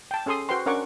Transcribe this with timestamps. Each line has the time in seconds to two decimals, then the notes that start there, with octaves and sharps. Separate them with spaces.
0.11 G5 A5
0.26 C#4 G#4 A4 C6 D#6
0.49 F#4 B4 C5 G5 C6
0.66 C#4 D4 A#4 F#5 C#6 D6